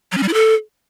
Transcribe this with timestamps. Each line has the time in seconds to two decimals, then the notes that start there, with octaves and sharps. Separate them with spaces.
0.12 F#3
0.17 C#4
0.23 G3
0.28 E4
0.34 A4